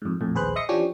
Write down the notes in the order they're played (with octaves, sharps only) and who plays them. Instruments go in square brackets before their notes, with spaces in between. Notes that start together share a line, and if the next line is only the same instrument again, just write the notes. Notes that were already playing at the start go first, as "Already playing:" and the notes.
[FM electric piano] F2 G#2
A#1 F2 A2
A#1 D#2 G#4 B4 C5 F#6
D#5 E5 C6 D#6 A#6 C#7
E3 F3 C#4 D4 G4 C#5